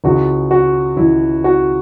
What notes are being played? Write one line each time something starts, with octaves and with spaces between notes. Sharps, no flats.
C#2 C#3 E3 F#4
F#4
C#2 C#3 E3 E4
F#4